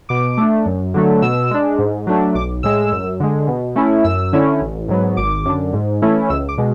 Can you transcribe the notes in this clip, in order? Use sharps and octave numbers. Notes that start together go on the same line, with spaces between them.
B2 D6
A3 D4
F#2
D3 F#3 A3
B2 E6
G#3 D4
G#2
F#3 A3 D4
B1 D6
A2 G#3 E6
F#2
D3 G#3
B2
A3 C#4 E4
F#2 E6
D3 A3 C#4 E4
A1
G#2 F#3 B3
G#1 D6
F#2 D3
G#2
E3 A3 C#4 E4
C#2 E6
D6
B2 G#3